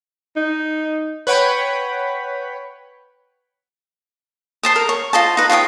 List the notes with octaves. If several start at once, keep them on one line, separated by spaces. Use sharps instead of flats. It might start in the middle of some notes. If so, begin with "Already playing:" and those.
D#4
B4 C#5 F#5 G5 B5
C5 A5 D#6
A#4
C#5
F4 C5 D#5 A5
D#4 B4
F4 C#5 G5 D#6